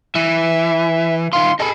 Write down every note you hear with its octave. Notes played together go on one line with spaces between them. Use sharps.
E3 E5
D#3 F4 C6
G#4 A4 D#5 B5